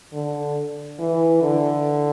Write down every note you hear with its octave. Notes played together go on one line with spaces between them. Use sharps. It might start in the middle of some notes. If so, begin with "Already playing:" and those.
D3
E3
D3